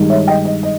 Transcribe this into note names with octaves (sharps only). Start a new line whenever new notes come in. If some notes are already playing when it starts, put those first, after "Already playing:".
Already playing: G2 D#3 G#3 D#4
C#5 E5
D#5 G5
D#5
D#5